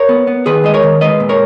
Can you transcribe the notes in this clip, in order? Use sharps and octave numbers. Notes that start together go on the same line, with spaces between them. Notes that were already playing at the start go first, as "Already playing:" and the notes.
Already playing: A#4 C#5
B3
B3
D#3 G#4 B4
G#3 D#5
A#4 C#5
D#3
G#3 B4 D#5
A#2
A#4 C#5